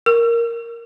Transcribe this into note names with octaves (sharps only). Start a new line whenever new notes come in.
A#4